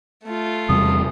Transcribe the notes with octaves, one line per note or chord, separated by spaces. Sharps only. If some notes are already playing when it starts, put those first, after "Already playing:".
A3 F4
E2 C3 G3 D#6